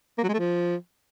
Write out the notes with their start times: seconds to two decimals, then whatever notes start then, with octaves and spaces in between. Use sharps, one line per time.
0.18 A#3
0.23 F#3
0.29 G#3
0.34 A3
0.39 F3